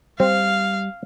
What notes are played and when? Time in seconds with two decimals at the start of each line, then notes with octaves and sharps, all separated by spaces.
0.20 G3 C4 F5